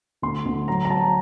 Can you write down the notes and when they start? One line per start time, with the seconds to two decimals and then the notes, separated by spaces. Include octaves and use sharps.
0.22 D2 C6
0.45 D2
0.68 F#3 A#5
0.85 A#5
0.90 F#3 A5